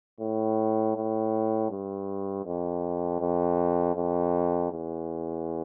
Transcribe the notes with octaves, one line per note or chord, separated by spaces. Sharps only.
A2
A2
G2
F2
F2
F2
E2